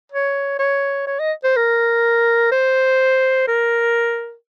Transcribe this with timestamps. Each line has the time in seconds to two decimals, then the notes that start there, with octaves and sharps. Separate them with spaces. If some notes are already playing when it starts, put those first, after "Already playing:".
0.12 C#5
0.59 C#5
1.07 C#5
1.19 D#5
1.44 C5
1.56 A#4
2.52 C5
3.48 A#4